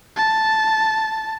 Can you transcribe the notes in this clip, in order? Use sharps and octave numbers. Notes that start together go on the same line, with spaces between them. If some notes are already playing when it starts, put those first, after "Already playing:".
A5